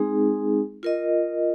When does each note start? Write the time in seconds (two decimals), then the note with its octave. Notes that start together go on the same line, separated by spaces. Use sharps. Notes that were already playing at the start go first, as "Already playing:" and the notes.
Already playing: G#3 C4 D#4 G#4
0.83 F4 A#4 D#5